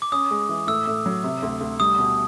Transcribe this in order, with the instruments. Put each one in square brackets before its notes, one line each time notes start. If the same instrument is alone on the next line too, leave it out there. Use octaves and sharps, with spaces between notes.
[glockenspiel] D6
[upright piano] C#4 [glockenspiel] D#6
[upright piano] G#3
E3
[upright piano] A2 [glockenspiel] E6
[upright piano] A2
F#3
C3
D2
D2
[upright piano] G3 [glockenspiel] D#6
[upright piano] B2